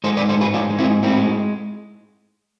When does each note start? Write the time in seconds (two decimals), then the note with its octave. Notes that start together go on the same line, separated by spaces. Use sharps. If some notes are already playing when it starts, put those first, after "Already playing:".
0.04 G#3 A4 C5
0.17 B4 D5
0.21 G#2
0.29 A4 C5
0.37 G#2 G#4 B4
0.54 G#3 D4 F4
0.70 G#3
0.79 C4 E4
0.87 G#2
1.03 A2 C4 E4
1.19 G#3